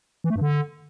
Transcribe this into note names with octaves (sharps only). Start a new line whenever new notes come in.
E3
A3
G2
D3